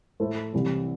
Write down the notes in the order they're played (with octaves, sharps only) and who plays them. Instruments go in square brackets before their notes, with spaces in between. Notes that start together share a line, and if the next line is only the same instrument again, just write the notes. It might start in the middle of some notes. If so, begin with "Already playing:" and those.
[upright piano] A2 A3 E4 C5
C2 C3 E3